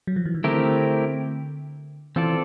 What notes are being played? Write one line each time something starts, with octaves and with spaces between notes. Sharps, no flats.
F#3
F3
E3
D#3
D3 A3 C4 E4 G4 A#4
E3 C4 F4 A4 D5